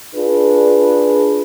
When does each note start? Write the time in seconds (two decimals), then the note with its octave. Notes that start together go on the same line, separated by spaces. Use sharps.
0.15 D4 F4 G#4 B4